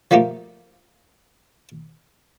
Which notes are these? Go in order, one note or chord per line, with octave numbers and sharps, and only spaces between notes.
F3 G3 A3 A#3 G4